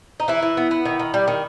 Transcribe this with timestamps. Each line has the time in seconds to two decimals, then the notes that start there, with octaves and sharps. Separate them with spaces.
0.20 D#4
0.28 E3 E4
0.42 E3
0.57 B3
0.71 B3
0.85 D#3
0.99 D#3
1.14 G3
1.28 D#3